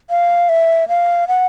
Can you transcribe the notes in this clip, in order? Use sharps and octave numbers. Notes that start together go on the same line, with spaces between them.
F5
E5
F5
F#5